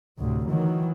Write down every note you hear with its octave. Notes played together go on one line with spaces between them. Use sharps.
D2 A2 C3
D#3 E3 F#3